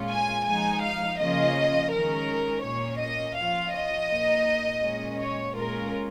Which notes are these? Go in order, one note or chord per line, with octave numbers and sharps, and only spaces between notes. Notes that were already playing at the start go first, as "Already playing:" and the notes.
Already playing: A#2 G#3 C#4 F4
G#5
F3 G#3 D#4 G#5
F5
C#3 F3 A#3 C#4 F4 D#5
D#3 G#3 C#4 A#4
A#2 A#3 C#4 C#5
D#5
F3 C#4 F4 F5
D#5
A#2 A#3 D#4
A#2 G#3 C#4
C#5
A#2 G#3 C#4 F4 A#4